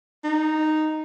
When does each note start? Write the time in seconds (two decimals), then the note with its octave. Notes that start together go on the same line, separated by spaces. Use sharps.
0.24 D#4